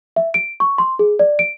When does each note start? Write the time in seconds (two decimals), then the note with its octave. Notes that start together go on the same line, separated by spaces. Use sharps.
0.16 E5
0.34 D7
0.60 C#6
0.78 C6
0.99 G#4
1.19 D5
1.39 D7